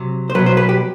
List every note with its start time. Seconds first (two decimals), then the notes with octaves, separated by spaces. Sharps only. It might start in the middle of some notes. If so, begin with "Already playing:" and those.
Already playing: C3 F#3
0.30 C5
0.35 F#3 B4
0.39 B2
0.46 C5
0.57 B4
0.69 G4